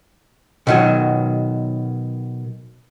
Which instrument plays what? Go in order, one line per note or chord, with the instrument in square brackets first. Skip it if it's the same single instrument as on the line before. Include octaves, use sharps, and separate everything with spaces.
[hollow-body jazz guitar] B2 D#3 F#3